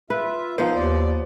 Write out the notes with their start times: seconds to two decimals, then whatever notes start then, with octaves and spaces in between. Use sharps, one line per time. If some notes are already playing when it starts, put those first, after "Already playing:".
0.10 F4 B4 E5
0.58 F3 B3 D#4 C5
0.75 D#2 D5